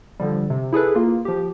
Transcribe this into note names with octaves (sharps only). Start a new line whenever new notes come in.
D3 F3 G3
C3
E4 G#4 A4 B4
A#3 F4
F3 G4